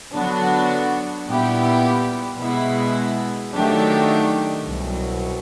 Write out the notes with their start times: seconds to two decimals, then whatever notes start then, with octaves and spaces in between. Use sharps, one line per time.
0.14 D3 F#3 B3 D4 F#4
1.27 A#2 G3 B3 E4 G4
2.40 B2 G#3 B3 E4
3.53 D#3 F#3 A3 D4 G4
4.66 C2 B2 F#3